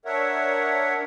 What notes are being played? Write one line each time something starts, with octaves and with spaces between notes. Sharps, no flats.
D4 A#4 C#5 E5 F#5